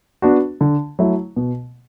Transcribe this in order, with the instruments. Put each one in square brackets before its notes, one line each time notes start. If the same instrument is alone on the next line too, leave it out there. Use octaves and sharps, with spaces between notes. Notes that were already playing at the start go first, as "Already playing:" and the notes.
[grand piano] B3 D4 F#4
D3
F#3 A3 E4
B2